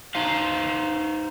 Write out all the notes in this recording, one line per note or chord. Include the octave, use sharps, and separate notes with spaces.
D#4 C5 F5